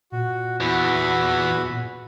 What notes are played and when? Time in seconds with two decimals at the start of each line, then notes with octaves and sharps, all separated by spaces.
0.12 A#2 F#4
0.61 E2 E4 F#4 B5